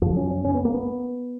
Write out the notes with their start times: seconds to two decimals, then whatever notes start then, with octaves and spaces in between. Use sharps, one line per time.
0.02 F#2 C#3 F3
0.17 C#4
0.31 C#4
0.45 C#4
0.55 B3
0.65 A#3
0.74 B3